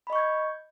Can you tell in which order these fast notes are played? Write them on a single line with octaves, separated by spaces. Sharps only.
B5 D#5 C#6 G6 G#6